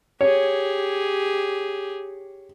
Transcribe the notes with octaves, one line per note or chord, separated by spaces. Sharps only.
G4 G#4 C#5